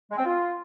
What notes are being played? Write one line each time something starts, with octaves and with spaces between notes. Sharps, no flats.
G#3
C4
F4